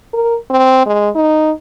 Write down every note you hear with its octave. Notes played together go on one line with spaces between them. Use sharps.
A#4
C4
G#3
D#4